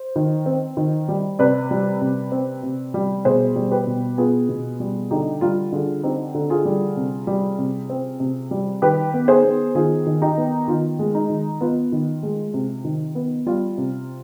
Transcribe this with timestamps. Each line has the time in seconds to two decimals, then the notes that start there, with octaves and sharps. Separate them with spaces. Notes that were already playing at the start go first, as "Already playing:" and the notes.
Already playing: C5
0.16 D#3
0.46 C4
0.77 D#3
1.08 G3
1.39 C3 B4 D5
1.71 G3
2.01 C3
2.32 C4
2.63 C3
2.94 G3
3.25 B2 G#4 C5
3.56 G3
3.71 G4 B4
3.87 B2
4.18 B3 F4 G#4
4.49 B2
4.80 G3
5.11 D3 D#4 G4
5.41 G3 F4
5.73 D3 F4 G#4
6.03 C4 D#4 G4
6.35 D3
6.50 F4 G#4
6.65 G3
6.97 C3
7.27 G3
7.59 C3
7.90 C4
8.20 C3
8.51 G3
8.82 D#3 G4 B4
9.14 B3
9.28 G#4 C5
9.44 B3
9.75 D#3 F4 G#4
10.07 D#3
10.22 D#4 G4
10.37 B3
10.68 D#3 F4
10.99 G#3
11.15 D#4
11.30 D#3
11.61 B3 F4
11.92 D#3
12.23 G#3
12.54 C3
12.85 D#3
13.15 B3
13.46 G3 F4
13.78 C3